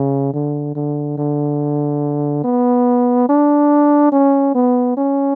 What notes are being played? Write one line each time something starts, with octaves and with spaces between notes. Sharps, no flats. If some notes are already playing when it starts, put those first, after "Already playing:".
Already playing: C#3
D3
D3
D3
B3
D4
C#4
B3
C#4